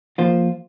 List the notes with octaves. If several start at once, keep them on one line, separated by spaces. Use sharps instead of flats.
F3 A#3 F4 C5